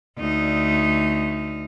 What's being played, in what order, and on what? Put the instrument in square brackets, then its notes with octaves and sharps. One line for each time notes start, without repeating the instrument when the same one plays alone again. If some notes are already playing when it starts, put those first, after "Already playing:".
[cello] D2 D#4